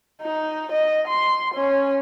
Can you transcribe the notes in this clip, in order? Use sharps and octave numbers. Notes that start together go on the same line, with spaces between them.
D#4
D#5
C6
C#4